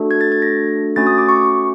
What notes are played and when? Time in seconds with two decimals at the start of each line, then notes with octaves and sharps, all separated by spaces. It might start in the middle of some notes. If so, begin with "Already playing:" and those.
Already playing: A3 D4 F#4 A4
0.11 G#6
0.21 A6
0.32 G#6
0.42 A#6
0.96 A3 C#4 F#4 A6
1.07 D#6
1.18 D6
1.29 C#6